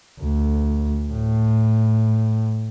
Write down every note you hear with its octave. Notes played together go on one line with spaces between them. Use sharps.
D2
A2